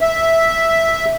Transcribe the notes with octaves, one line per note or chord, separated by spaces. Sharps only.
E5